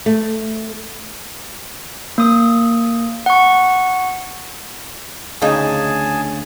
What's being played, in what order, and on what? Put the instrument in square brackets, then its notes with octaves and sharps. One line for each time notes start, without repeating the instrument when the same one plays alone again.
[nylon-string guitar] A3
[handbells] A#3 D#6
F#5 C#6
[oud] D2 D#4 [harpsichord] C#3 [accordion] G#4 G#5 A5